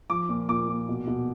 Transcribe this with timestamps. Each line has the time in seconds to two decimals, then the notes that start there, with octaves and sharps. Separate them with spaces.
0.10 F3 D6
0.29 A#2
0.49 A#2 D6
0.68 A#2
0.89 B2
1.07 B2